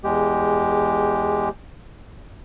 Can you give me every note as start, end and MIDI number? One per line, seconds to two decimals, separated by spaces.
0.04 1.49 40
0.04 1.49 56
0.04 1.49 67